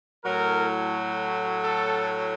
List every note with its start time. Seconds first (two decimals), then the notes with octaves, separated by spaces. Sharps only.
0.24 A2 F#3 A#4
1.63 A4